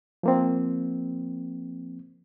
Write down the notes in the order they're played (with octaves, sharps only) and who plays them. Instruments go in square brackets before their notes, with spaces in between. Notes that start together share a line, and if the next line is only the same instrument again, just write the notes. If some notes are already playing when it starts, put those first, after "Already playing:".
[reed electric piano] F3 A#3 C4